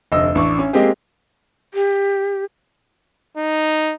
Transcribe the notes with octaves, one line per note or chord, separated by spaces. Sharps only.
F1 D2 D#5 E6
A1 D4 C#6
C#4
G#3 A#3 C4 G4 G#4
G4
D#4